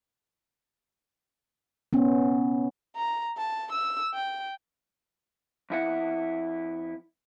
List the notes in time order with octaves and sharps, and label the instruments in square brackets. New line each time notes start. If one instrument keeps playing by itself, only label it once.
[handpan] B3 C#4
[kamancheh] A#5
A5
E6
G5
[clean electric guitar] F2 E4 F#5